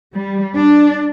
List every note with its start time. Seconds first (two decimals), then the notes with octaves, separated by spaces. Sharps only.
0.16 G3
0.55 D4